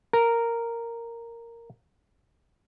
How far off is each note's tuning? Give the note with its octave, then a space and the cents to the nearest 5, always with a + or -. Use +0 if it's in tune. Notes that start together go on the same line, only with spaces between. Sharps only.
A#4 -5